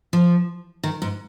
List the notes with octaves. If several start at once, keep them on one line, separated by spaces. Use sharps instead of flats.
F3
D#3
G#2